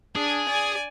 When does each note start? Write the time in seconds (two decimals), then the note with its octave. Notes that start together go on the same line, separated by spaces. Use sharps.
0.16 D4 G#4
0.49 D5 G#5